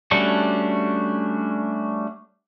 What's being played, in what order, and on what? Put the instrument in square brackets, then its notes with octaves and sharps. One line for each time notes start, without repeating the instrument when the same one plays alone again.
[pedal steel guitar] G3 A3 C#4 D4 F#4